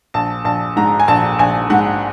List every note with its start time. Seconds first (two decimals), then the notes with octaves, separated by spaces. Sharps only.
0.14 A#1 A5
0.45 A#1 A5
0.76 G#2 A#5
1.00 G#5
1.08 A#1 A5
1.39 A#1 G#5
1.70 G#2 F#5